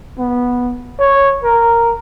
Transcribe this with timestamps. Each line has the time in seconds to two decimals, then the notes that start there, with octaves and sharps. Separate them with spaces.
0.19 B3
0.99 C#5
1.44 A#4